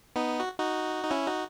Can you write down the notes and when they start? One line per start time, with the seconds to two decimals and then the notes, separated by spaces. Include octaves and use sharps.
0.16 B3 D#4
0.40 F#4
0.58 D#4 F#4
1.04 D#4
1.11 C#4 E4
1.26 D#4 F#4